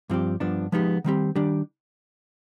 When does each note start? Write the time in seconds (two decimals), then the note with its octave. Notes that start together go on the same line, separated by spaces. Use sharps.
0.10 G2 F3 C4 G4
0.40 G2 F3 B3 D4
0.72 F3 G#3 B3 D#4 G4
1.04 D#3 G3 C4 G4
1.35 D#3 G3 D4 G4